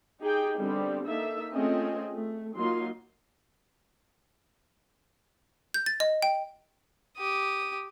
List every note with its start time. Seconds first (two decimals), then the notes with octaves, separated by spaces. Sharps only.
0.20 D#4 G4 G#4 G5
0.57 D3 G3 B3 C4 G4
1.06 A#3 D#4 A4 E5
1.54 A3 C4 C#4 F4 G#4 D#5
2.15 A3
2.56 F#3 A#3 D#4 F4 C6
5.74 G6
5.86 A6
6.00 D#5
6.22 G5
7.18 G4 D#6